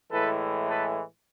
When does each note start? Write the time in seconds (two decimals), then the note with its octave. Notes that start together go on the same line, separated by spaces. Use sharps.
0.11 A2 E3 G#3 A4 B4
0.68 A4 B4